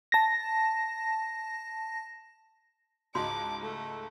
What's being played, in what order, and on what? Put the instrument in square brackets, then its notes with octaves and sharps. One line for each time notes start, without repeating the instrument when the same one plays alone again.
[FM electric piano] A5 A#6
[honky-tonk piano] C#2 G#2 G#3 [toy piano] F#4 C6 [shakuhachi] A5 [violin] D6
[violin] A3 [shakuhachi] A4